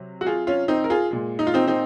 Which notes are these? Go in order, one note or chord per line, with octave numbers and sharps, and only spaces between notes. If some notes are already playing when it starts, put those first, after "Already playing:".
Already playing: C3 F#3
F#4
F4 G#4
C#4 F4
C4 D#4
A#4
F4 G#4
A#2 G#3
D#4
F4
C4 D#4
C4 D#4